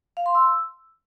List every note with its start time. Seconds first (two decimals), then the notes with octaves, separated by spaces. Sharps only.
0.17 F5
0.26 C6
0.35 E6